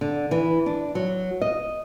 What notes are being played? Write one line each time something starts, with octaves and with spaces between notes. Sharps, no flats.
D3
E3
D4
F#3
D#5